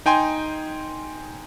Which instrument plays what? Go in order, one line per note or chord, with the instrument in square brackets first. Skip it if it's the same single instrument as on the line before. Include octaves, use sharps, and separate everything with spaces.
[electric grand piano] D#4 G5 G#5 C6